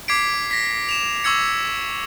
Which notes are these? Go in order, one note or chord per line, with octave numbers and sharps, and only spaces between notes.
D6 G#6 B6 C7 D7
A#6 B6
E7 F7
C#6 D6 E6 G#6 C#7